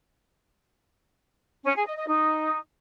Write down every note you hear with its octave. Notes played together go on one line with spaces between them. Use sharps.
C#4
G#4
D#5
D#5
D#4